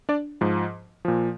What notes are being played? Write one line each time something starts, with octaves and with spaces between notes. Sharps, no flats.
D4 D5
G#2 F3
A#2 F3